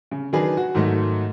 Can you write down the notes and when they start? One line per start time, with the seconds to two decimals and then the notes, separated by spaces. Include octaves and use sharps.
0.11 C#3
0.33 D#3 F#3 D4 G#4 B4
0.57 F#4
0.75 G#2 D#3 F#3 A3